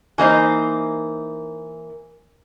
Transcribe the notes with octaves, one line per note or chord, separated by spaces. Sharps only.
E3 A#3 D#4 C5